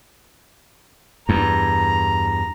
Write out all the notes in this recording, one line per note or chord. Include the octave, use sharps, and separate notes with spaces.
E2 G2 A#5